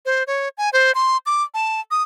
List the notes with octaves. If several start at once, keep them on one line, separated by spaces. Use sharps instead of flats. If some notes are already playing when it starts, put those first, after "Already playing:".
C5
C#5
G#5
C5
C6
D6
A5
D#6